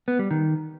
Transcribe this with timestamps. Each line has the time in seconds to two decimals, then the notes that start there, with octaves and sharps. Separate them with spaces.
0.08 B3
0.19 G3
0.31 D#3